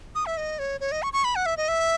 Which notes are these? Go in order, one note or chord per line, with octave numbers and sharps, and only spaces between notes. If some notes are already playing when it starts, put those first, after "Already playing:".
D#6
E5
D#5
C#5
C#5
D#5
C#6
C#6
B5
F#5
E5
D#5
E5